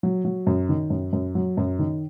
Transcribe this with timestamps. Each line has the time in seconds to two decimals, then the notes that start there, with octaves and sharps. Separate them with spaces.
0.03 F#3
0.25 F#3
0.47 F#2
0.69 D#3
0.90 F#2
1.13 F#2
1.35 F#3
1.57 F#2
1.79 D#3